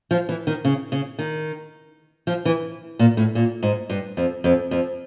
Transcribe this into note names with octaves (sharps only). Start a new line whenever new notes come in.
F3
E3
D#3
C#3
C#3
D#3
F3
E3
A#2
A2
A#2
G#2
G2
F2
F2
F2